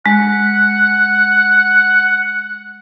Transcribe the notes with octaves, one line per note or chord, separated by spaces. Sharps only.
G#3 F#5